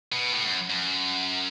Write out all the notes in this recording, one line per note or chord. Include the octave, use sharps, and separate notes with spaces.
B2
A2
F#2
F#2